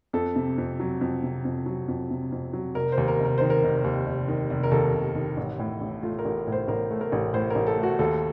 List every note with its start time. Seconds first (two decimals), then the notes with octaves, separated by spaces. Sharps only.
0.13 F2 A4
0.36 C3
0.58 F2
0.80 F#3
1.01 F2
1.23 C3
1.45 F2
1.66 F#3
1.88 F2
2.10 C3
2.32 F2
2.53 F#3
2.75 F1 A#4
2.92 C5
2.98 D#2
3.08 A#4
3.20 F1 A#4
3.38 D#3 C5
3.50 A#4
3.63 F1
3.84 D#2
4.06 F1
4.28 D#3
4.50 F1
4.63 A#4
4.71 D#2 A4
4.94 F1
5.16 D#3
5.37 A1
5.59 A2
5.81 A1
6.02 A3 F4
6.19 A#4
6.25 A1
6.47 A2
6.52 C5
6.68 A1 A#4
6.91 A3
7.01 A#4
7.12 A1
7.34 A2 C5
7.50 A#4
7.55 A1
7.67 A4
7.78 A3
7.83 F#4
7.99 D#2 A4